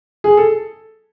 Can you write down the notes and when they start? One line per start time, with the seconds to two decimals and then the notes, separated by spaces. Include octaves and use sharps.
0.24 G#4
0.37 A4